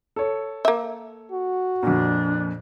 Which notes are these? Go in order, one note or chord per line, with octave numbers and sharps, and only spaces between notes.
A4 C#5
A#3 E5
F#4
F2 A#2 D4